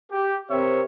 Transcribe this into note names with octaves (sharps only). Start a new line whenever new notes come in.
G4
C3 C4 A#4 C#5 E5